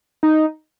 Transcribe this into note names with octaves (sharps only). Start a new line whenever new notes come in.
D#4